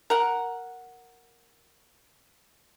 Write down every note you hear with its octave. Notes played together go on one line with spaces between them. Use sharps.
A#4 F#5